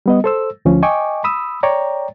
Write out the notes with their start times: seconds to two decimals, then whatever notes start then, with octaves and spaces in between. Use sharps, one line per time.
0.06 G3 B3 D#5
0.24 A4 C5 E6
0.65 D2 F3 C#4
0.83 D#5 G5 G#5 C#6 D6
1.24 B5 D#6 E6
1.63 C#5 D5 G5 A#5